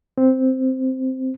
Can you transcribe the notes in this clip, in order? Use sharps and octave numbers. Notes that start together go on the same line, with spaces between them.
C4